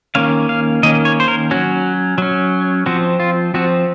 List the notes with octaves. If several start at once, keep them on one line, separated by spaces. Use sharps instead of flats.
D#3 A#3 C#4 F5
F5
D#3 A#3 C#4 D#5
C#5
C5
A#4
F#3 C#4 F#4
F#3 C#4
F3 C4 F#4
F4
F3 C4 F#4